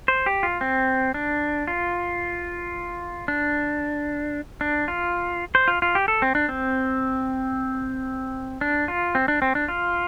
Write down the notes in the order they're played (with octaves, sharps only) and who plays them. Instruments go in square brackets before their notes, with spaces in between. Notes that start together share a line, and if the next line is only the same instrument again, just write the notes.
[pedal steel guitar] C5
G4
F4
C4
D4
F4
D4
D4
F4
C5
F4
F4
G4
A4
C4
D4
C4
D4
F4
C4
D4
C4
D4
F4